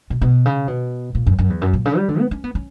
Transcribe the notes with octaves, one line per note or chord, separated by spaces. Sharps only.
B2
B2
C#3
B2
A#2
F#2
F#2
E2
F#2
A#2
C#3
G3
D3
B3
C#4
B3
C#4